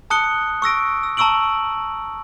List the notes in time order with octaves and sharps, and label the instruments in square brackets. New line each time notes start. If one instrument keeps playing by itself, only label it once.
[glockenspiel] A5 D#6 F#6 C#7 G7
C#6 E6 A#6 D7
E6
A5 A#5 C#6 E6 D7 F#7